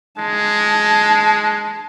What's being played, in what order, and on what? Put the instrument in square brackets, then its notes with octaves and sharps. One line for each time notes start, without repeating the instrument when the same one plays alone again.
[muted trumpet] G#3 [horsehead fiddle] A5